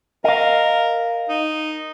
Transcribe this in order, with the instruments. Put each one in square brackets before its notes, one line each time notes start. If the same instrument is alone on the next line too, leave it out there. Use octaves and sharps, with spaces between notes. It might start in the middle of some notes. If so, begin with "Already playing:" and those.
[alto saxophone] A#4 [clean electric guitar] D#5 F5
[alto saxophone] D#4